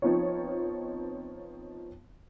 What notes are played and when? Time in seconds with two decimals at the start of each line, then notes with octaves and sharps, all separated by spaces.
0.02 F3 B3 C4 D#4 F4 C#5